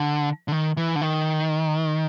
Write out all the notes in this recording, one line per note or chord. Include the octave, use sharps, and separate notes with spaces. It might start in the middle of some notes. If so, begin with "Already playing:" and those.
Already playing: D3
D3
D#3
E3
D3
D#3